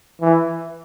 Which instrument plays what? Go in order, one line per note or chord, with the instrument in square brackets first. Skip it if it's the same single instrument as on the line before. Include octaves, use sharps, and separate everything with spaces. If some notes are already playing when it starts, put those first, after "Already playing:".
[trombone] E3